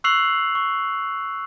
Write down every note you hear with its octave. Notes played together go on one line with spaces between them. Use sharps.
C#6 E6 F#6 C7 F7 F#7
C#6